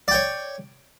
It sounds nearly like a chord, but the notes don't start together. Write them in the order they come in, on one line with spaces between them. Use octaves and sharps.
D5 G5 C#5